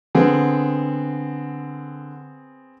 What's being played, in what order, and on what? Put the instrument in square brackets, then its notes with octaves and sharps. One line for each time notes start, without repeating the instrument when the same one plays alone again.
[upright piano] D3 [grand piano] B3 C4 G#4